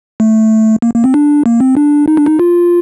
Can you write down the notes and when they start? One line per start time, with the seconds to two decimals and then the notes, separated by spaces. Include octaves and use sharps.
0.20 A3
0.82 A#3
0.94 A#3
1.04 C4
1.14 D4
1.46 A#3
1.61 C4
1.77 D4
2.08 D#4
2.17 D4
2.26 D#4
2.40 F4